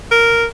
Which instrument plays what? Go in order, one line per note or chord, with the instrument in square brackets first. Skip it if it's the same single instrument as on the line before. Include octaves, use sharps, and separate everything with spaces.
[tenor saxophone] A#4